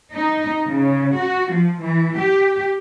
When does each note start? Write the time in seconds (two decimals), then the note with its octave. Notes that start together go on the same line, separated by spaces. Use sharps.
0.14 D#4
0.65 C#3
1.16 F#4
1.52 F3
1.81 E3
2.16 G4